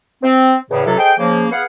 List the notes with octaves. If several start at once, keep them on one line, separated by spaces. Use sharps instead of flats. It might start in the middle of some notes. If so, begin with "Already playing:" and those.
C4
E2 A2 C#3
C#2 C3 F#3 A4
G#4 A4 C5 D#5 G5
C#3 F3 A#3
B3 G#4 F5 F#5